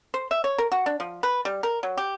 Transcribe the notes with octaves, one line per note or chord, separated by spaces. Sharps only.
C5
E5
C#5
A#4
F#4
D4
F3
B4
G3
A#4
F#3
G4